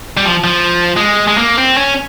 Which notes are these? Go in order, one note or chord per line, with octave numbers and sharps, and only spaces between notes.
G3
F3
F3
G#3
G#3
A#3
C4
C#4